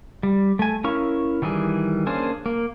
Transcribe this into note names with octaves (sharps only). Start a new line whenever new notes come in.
G3
A3 G#5
C#4 E4 A#4 F5 C#6
D#3 E3 G3 G#4
A#3 C#4 D4 G#4 C5
A#3